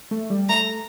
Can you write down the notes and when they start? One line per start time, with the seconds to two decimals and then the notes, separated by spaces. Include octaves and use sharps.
0.11 A3
0.30 G3
0.49 A3 A#5